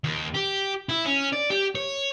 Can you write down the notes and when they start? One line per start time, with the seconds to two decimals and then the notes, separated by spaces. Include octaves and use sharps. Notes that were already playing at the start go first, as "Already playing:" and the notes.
0.04 D#2
0.34 G4
0.89 E4
1.06 C#4
1.33 D5
1.51 G4
1.75 C#5